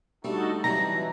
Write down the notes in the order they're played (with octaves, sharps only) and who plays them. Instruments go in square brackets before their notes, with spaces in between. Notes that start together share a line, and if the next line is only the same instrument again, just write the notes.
[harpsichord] G3 A3 E5 [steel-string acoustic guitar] D4 [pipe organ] D#4 F#4 A4
[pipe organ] E3 [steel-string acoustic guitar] F#3 D#4 [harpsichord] G3 C4 D4 [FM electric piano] A#5 A#6